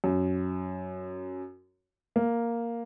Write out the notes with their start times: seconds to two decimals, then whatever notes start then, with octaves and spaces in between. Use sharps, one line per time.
0.04 F#2
2.16 A#3